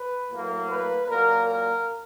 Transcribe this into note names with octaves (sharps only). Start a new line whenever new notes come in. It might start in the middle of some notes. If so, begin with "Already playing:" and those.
Already playing: B4
A2 F#3 A#3
B4
A#2 F#3 A#3 A#4
A#4